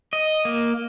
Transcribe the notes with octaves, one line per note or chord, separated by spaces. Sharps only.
D#5
A#3